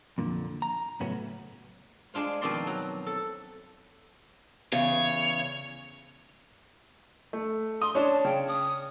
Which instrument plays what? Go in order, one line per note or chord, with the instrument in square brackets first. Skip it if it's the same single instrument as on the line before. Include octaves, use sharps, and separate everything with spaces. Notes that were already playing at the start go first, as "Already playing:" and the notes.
[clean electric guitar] F2 A#2 D3
A#5
A2 C#3 F#3 A3 B3 C#4
[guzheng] G#3 D4 F4 C5
B2 D#3 F3 C4 D5 C6
F#3
A4
[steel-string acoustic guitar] E2 C#3 [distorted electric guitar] C#5
[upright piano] A3
[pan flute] C6 [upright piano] D#6
[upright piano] C#4 D4 [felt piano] C#5 [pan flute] A5
[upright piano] C#3 [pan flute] G5
[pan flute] D#6